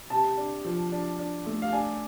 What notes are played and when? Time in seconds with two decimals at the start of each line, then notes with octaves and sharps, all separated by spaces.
0.10 C3 A5
0.37 D4
0.64 F3
0.92 D4
1.19 D4
1.46 A3
1.62 F5
1.73 D4 G#5